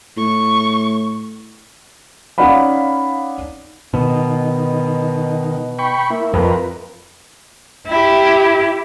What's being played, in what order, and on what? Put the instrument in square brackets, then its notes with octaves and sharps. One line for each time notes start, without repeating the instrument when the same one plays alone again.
[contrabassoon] A2 [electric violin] C#6
[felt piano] C#4 D#4 D5 F5 F#5 B5
[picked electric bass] B2 [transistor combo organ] D#3
[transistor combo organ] G5 B5 C#6
A#3 E4
[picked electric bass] F2 [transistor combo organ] F4 A#4 B4
[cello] E4 G4